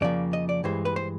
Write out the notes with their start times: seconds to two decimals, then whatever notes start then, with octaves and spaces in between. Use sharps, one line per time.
0.01 F2 C#3 F3 A#3 D5
0.33 D#5
0.49 D5
0.64 G2 E3 G#3 C5
0.85 B4
0.96 C5